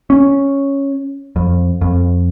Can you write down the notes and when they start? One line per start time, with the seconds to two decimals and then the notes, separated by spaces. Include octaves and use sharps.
0.10 C#4
1.36 F2
1.81 F2